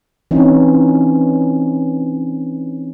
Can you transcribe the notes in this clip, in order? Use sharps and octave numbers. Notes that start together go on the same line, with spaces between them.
E3 C4 C#4 D#4